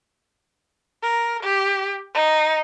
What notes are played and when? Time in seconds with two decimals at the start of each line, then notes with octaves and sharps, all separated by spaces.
1.03 A#4
1.43 G4
2.14 D#4